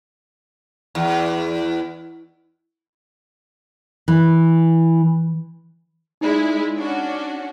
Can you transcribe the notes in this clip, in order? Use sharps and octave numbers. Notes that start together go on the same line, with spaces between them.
E2
E3
G#3 D#4 E4 D5
C#4 D4 F#4